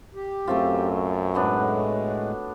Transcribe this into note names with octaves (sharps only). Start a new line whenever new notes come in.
G4
F#2 A3 C4 F4
A2 F#3 G#3 B3 D4